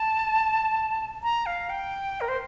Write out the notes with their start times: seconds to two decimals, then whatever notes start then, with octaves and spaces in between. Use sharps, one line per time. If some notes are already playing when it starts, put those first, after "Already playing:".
Already playing: A5
1.23 A#5
1.46 F5
1.70 G5
2.21 A#4
2.29 C5